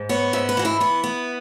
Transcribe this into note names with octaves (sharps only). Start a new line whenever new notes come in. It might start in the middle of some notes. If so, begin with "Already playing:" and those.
Already playing: G#2
B3 C#5
G#2 E5
B4
E3 F#4
E4
B3 E4
B3